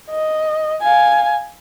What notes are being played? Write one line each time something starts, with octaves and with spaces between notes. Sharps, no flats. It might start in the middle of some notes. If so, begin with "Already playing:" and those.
D#5
F5 G#5